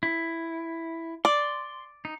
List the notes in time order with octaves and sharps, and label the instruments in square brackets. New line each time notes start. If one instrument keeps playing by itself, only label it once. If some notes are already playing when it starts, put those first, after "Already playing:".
[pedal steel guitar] E4
[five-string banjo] D5 [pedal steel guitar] C6
[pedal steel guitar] D#4